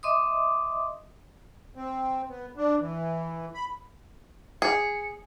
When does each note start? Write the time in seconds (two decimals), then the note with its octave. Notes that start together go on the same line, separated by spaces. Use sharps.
0.03 D#5 E5 C6 D6 D#6
1.75 C4
2.29 B3
2.57 D4
2.80 E3
3.54 B5
4.62 G#4 C#7